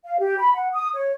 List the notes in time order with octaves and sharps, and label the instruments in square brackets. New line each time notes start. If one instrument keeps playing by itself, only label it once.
[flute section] F5
G4
B5
F#5
D#6
C#5